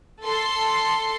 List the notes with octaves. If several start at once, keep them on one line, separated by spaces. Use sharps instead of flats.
A4 C6